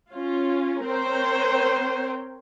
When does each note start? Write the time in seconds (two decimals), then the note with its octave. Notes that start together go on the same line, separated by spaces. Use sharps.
0.11 C#4 F4
0.84 C4 A#4 C5 C#5 G5